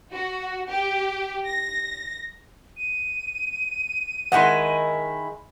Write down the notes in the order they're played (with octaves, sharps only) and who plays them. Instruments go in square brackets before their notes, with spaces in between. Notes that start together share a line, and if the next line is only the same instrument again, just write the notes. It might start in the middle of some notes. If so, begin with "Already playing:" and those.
[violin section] F#4
G4
A#6
[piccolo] D#7
[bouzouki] D#3 G#3 E4 [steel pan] F#5 C6